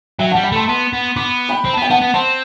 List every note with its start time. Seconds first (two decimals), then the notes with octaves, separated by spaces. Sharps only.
0.19 F#3 E5 G5
0.31 G3 F#5 A5
0.43 G5 B5
0.52 A3 A5 C6
0.67 B3 A5 C6
0.93 B3
1.16 B3 B5 D6
1.49 G5 B5
1.65 C4 B5
1.73 A5
1.77 B3
1.82 G5
1.90 B3 F#5 A5
2.01 B3
2.14 C4 A5 C6